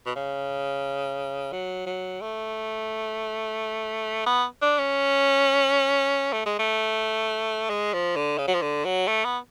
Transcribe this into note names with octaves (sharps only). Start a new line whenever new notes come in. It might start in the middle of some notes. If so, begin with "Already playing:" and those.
B2
C#3
F#3
F#3
A3
B3
D4
C#4
A3
G#3
A3
G#3
F3
D3
C#3
F#3
F3
D3
F#3
A3
B3